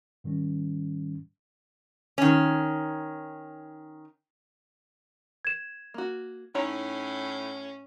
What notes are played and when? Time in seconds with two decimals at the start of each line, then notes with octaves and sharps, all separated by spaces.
0.24 G#2 D#3 G3 C#4
2.18 D#3 C#4
5.45 G#6 E7
5.94 A#3 F#4
6.55 A2 C#4 D#4 E4 C#5